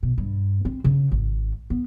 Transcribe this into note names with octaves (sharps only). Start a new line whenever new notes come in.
B2
G2
C4
C#3
G#1
B3